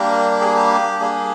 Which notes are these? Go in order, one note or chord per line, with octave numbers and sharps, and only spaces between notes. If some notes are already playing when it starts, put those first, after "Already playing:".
Already playing: G3 A#3 D4 G4 A#4
G#4
G4
G3 A#3 D4 G#4